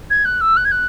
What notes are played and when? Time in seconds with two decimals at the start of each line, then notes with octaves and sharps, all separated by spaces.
0.10 G#6
0.25 F#6
0.41 E6
0.57 F#6
0.65 G#6
0.71 F#6